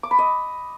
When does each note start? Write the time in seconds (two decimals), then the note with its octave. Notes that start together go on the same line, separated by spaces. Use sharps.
0.03 D6
0.11 B5
0.19 D#5